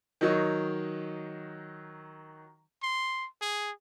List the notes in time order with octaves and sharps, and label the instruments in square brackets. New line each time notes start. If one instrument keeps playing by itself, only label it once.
[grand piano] D#3 F#3 D#4
[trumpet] C6
G#4